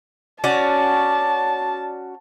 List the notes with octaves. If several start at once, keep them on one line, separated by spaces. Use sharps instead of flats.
C#4 F#4 D5 A5